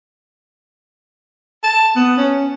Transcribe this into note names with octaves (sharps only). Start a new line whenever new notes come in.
A5
B3
C#4